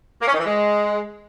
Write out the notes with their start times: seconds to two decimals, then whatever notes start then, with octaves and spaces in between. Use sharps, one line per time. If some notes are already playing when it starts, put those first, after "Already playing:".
0.21 A#3
0.27 C#4
0.33 D#3
0.39 E3
0.45 G#3